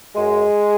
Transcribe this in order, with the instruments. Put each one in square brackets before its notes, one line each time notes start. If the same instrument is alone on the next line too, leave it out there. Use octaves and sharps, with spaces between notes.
[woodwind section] F#2 G#3